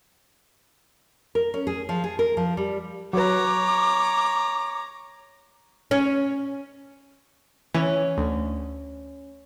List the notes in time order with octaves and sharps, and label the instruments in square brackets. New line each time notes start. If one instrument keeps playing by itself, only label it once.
[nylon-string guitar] A#4
C#4
G#4
F3
G#4
A#4
F3
G3
[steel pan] F#3 B4 [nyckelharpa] C#5 A#5 [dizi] D6
[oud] C#4
[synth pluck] E3 [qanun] C#4
[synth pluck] D2